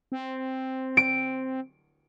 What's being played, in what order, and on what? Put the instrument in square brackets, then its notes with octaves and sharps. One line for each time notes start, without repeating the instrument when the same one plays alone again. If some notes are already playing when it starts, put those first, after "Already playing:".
[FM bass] C4
[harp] D7